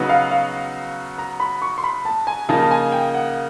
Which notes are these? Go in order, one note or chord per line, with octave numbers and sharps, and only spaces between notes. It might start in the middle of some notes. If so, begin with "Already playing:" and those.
Already playing: C#3 F#3 B3 D#4 F#4
F5
F5
A#5
B5
C#6
C6
B5
A5
G#5
C#3 F3 A#3 D#4 A5
A5
G#5
G5
F#5